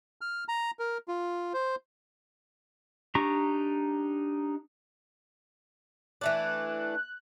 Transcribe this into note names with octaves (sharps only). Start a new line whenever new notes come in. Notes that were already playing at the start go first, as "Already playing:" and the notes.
F6
A#5
A#4
F4
C5
D4 D#4 G4 A#5 C#6
E3 A3 D4 F#6